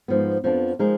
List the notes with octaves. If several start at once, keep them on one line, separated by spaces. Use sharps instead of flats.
G#2 F3 B3
F2 F3 B3 D4
F3 G#3 D#4 A#4